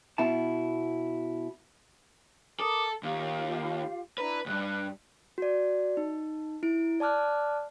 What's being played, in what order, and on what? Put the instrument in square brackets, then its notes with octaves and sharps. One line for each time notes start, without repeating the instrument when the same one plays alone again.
[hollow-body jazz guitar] B2 E4 A5
[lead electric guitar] A4 [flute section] A#4 D6 D#6
[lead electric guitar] D#2 [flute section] F4 G4 F5
[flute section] D4 E4 A#5 [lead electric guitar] B4
[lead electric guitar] C#2 G2 [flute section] F#6
[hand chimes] F#4 D5
D#4
E4 D7
D5 A5 D6 F6 F#6